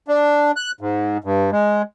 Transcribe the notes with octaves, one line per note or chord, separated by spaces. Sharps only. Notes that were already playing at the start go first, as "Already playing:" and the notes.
D4
F#6
G#2
G2
G#3